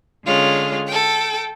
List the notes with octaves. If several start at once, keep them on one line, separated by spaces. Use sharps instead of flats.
D3 G#3 C#4 F4
A4 G5